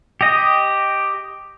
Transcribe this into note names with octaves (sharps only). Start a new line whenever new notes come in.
G4 D#5